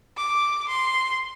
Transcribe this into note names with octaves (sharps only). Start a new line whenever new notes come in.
D6
C6